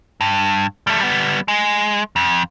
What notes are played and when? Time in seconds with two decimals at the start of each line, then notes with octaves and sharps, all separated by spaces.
0.21 G2
0.87 G3 A3
1.00 G3 B3
1.48 G#3
2.16 F2